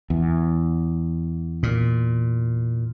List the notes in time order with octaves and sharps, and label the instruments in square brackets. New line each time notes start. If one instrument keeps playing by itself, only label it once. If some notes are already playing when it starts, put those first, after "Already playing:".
[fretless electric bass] E2
[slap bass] A#2